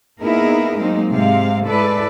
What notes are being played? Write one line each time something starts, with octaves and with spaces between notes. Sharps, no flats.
A#3 B3 D#4 E4 G#4 A#4
F#3 G#3 A#3 C4 D#4
G#2 C3 G#3 C4 F5
G#3 E4 A4 B4 D5